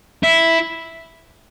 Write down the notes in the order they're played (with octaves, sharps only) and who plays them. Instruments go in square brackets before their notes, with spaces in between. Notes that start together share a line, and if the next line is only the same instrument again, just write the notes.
[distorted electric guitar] E4